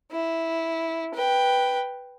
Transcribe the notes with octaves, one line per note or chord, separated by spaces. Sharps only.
E4
B4 G5